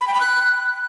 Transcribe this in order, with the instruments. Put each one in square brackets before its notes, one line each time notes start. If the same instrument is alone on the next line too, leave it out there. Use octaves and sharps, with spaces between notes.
[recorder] B5
G5
B5
F#6